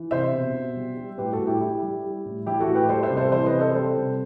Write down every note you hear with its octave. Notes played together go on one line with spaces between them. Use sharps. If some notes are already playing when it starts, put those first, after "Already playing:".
Already playing: E3
C3 C5 E5
B2
B2
G3
G3
A2 G4 B4
F#4 A4
A2
E4 G4
G3 E4 G4
G3
G3
A2
E3 E4 G4
F#4 A4
A2
G4 B4
G3 A4 C5
C5 E5
C3
A4 C5
E3 A4 C5
B4 D#5
C3
A4 C5
G3 A4 C5
C3